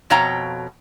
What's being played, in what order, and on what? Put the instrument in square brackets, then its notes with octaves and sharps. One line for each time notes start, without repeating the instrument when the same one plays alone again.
[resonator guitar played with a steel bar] F2 B2 C#5 F5 G5 A#5